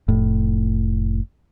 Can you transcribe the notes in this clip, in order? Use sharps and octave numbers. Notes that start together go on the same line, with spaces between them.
F1 A2